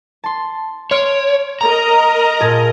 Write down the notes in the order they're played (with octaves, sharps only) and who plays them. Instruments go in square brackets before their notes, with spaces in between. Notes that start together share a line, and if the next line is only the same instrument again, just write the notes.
[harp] A5 C6
[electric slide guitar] C#5 [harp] C6 F6 D7
[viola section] A#4 D#5 [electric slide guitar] A#5
[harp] A#2 G#4 A5